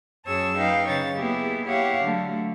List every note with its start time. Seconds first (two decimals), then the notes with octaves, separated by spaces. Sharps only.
0.27 F#2 F#3 G#4 C#5 A5 E6
0.58 D#4 B4 F5 G5
0.87 C#3 B4 C#5 A6
1.17 A#3 B3 E4 G4 G#4
1.66 E4 G4 C#5 F5 F#5
2.04 D3 F#3 A3